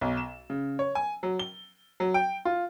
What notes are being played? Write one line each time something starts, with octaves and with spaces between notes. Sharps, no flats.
B1
E7
C#3
C#5
G#5
F#3
G7
F#3
G5
F4